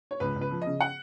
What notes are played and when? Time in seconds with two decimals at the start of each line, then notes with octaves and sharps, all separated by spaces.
0.11 C#5
0.20 C#2 B4
0.36 C#2
0.41 B4
0.51 F3
0.62 C#3 D#5
0.80 F#5